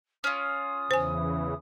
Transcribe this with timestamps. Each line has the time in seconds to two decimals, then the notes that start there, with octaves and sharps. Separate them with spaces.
0.24 C#4 F4 D#6
0.91 E2 C#3 E3 C5 G#5